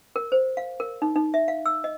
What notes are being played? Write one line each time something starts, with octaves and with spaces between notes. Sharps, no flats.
A#4
C5
F5
A#4
D#4
D#4
E5
F5
E6
D#5